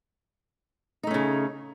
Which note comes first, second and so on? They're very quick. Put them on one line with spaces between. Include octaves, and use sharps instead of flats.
D#4 A3 C#4 C#3